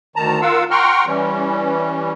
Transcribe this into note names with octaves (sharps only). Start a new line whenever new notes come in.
D2 D#3 A5 A#5
F4 A#4 F5 F#5 E6
F#5 G5 A#5 C6 C#6 F6
E3 G3 C#4